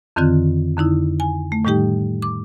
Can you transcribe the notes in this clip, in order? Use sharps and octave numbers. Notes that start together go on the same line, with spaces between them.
F2 D3 D#3 C4 F4 F#6
F2 D3 D#4 E4
G#5
A3
A2 D#3 G3 D#4 G4 G5
D6